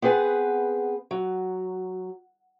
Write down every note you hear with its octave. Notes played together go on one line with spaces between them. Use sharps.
B3 C4 G#4 B4 F#5
F#3